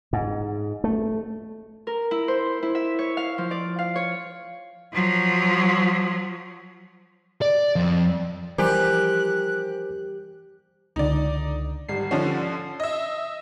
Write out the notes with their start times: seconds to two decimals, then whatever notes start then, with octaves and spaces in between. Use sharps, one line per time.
0.13 G#2
0.84 A3
1.87 A#4
2.11 E4
2.28 C5
2.62 E4
2.75 E5
2.99 C#5
3.17 F5
3.38 F3
3.51 D5
3.79 F5
3.96 C#5
4.93 F3 F#3
7.42 D5
7.76 F2
8.58 E3 F3 G3 G4 A#4 C5 G#5 F#6
10.96 C#2 D3 D#4 D5
11.88 G#1 G3 C7
12.11 D3 F3 C#4
12.80 D#5 E5